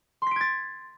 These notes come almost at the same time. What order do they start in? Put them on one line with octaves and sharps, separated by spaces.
C6 B6 D7 G#6 A6